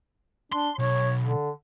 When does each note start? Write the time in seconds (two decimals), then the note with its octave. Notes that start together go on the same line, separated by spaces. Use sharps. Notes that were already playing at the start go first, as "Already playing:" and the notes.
0.52 D4 C6
0.79 B1 C#5
1.23 D3